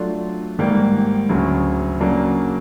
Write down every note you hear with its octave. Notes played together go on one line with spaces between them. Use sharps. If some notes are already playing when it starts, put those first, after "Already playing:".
Already playing: F#3 A3 D4 F4
G#2 D#3 G3 A#3
D2 C#3 F#3
C#3 F#3 A#3 D4